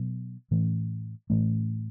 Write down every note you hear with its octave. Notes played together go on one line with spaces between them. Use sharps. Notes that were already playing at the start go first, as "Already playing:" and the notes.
Already playing: B2 F#3 B3
A2 E3 A3 C#4
A2 E3 A3 C#4